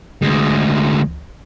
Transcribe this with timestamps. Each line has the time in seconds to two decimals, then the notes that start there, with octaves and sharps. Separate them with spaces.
0.22 D2 G#3